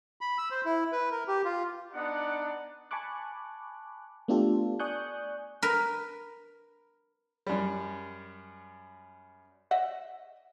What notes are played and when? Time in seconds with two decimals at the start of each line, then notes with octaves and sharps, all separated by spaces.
0.21 B5
0.38 E6
0.51 C5
0.65 E4
0.92 B4
1.11 A#4
1.28 G4
1.45 F4
1.93 B3 D4 D#4 D5 F#5
2.91 G#5 A5 B5 C#6 D6 F#6
4.28 A3 B3 D4 F4 G4 A4
4.79 D5 G#5 C#6 D#6 F#6 G6
5.62 A#4 B4
7.47 F#2 G3
9.71 D#5 E5 F#5